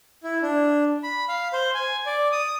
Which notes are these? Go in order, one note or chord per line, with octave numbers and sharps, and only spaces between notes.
E4
D4
B5
F5
C5
G#5
D5
D#6